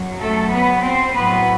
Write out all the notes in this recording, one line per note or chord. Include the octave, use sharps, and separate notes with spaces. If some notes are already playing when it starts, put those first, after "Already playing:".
Already playing: F#2 F#3
A3 A4
B3 B4
C4 C5
A2 F#3 B3 B4